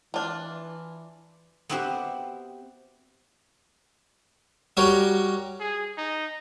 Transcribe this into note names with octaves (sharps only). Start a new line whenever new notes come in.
E3 D4 F4
B3 C4 E4 F#4 G4 C5
G3 F#4 G4 A#4 C#5
G#4
D#4